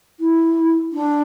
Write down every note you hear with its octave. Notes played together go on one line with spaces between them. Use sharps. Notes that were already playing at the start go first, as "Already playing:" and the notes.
E4
D4